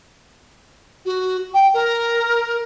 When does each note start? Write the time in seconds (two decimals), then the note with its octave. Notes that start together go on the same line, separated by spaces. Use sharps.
1.05 F#4
1.54 G5
1.74 A#4